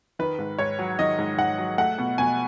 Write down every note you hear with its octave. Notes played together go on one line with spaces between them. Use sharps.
D#3 B4
G#2
G#2 C#5
F#3
D#3 D#5
G#2
G#2 F#5
F#3
A3 F#5
B2
B2 G#5